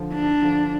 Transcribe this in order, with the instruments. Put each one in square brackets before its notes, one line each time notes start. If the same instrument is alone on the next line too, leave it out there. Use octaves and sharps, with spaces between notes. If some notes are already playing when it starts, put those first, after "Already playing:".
Already playing: [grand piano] D3 F3
[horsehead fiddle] D4
[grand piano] D3 F3